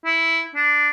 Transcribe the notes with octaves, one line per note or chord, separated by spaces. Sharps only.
E4
D4